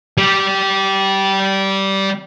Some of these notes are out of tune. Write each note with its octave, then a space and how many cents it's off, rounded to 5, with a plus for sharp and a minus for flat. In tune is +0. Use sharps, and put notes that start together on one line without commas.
G3 -15